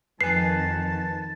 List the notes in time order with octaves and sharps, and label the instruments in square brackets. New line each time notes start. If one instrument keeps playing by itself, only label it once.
[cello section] F2 D#3 [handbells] B4 G#5 [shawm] A5 [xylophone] C7